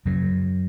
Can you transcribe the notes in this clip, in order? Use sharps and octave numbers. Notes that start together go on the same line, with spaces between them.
F#2 C#3 F#3